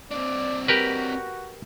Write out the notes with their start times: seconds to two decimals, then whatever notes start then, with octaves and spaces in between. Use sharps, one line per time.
0.11 C4 D4 D5
0.68 F#4 G4 A#4 B4